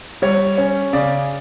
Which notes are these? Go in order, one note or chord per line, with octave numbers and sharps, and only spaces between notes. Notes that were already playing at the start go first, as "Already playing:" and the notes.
G3 C#5
C#4
C#3 D5